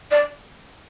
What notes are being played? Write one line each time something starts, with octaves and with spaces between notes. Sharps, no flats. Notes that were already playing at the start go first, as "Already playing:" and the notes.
D5